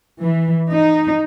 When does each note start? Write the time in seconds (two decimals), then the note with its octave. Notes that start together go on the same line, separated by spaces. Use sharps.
0.21 E3
0.69 D#4